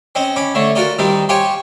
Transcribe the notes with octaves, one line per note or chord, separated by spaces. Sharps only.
C4 C#4 D#5
C#4 B5 D6
D3 A3 C#5
F4 F#4 A#4 D5 D#5
D#3 G3 C4 D#4
G4 C5 C#5 F5 G5 G#5